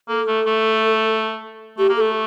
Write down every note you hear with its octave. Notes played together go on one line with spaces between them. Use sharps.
A#3 A4
A3
A3
A3 G4
A#3
A3 A4